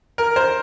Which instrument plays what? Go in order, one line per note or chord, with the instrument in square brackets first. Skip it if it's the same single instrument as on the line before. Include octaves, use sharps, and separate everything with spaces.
[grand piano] A#4
C5